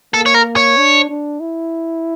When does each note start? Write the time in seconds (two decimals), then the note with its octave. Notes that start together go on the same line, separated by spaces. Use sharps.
0.14 A#3 A4
0.26 C#5
0.34 A#4
0.56 C#5
0.77 D4
1.09 D4
1.40 E4